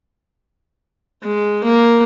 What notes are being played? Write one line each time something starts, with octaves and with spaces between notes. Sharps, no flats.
G#3
A#3